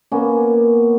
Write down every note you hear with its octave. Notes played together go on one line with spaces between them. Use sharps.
A#3 B3 C#4